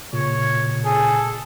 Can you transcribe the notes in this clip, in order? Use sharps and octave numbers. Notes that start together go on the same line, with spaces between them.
A#2 C#3 C#5
G#4 A4